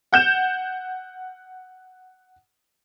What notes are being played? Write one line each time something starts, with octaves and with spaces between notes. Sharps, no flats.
F#5 G6 E7